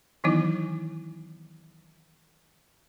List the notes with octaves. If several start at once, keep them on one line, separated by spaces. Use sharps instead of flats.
D#3 E3 F#3 B3 D#4 E4